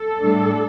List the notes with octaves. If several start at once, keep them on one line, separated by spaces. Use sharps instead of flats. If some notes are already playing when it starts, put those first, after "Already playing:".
Already playing: A4
A2 G3 D4